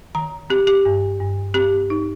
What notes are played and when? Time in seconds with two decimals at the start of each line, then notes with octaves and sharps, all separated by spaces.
0.15 D#3 A#5
0.50 C4 G4
0.67 G4
0.85 G2
1.20 G2
1.54 C4 G4
1.90 D#4